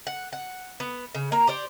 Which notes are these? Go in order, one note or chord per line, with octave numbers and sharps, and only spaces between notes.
F#5
F#5
B3
C#3
A#3 A#5
G4 C5 D5